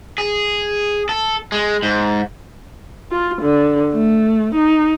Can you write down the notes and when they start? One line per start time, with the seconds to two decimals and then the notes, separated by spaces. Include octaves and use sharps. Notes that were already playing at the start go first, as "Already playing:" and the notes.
0.18 G#4
1.09 A4
1.52 G#3
1.83 G#2
3.12 F4
3.42 D3
3.93 A3
4.55 D#4